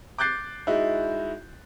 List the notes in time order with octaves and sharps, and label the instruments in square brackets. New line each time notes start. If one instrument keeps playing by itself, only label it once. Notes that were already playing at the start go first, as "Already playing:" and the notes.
[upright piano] D6 F#6 G6 A6 C7
G#3 D#4 E4 F#4